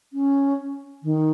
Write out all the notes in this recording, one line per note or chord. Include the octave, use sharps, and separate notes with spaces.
C#4
D#3